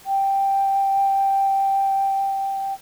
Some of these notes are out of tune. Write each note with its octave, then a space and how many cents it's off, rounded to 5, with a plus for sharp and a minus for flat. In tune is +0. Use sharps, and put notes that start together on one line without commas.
G5 +0